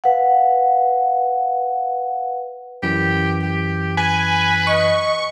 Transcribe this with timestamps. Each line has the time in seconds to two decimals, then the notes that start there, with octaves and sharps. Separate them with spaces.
0.04 B4 F5 F#5
2.83 F#2 E3 G4
3.43 G4
3.97 B4 G#5
4.67 D#5 C#6